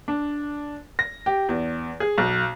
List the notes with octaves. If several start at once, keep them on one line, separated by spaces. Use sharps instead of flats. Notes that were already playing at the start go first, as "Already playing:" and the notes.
D4
A#6
G4
E2
G#4
B1